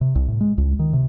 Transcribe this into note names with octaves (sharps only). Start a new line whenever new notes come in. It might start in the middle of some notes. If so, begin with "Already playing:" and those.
C3
C2
A2
G#3
C#2
D#3
C3